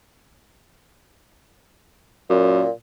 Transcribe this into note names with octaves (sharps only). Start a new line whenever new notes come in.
F#2 A#2